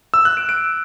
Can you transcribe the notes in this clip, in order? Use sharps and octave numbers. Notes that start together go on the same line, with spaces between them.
E6
F#6
D7
D7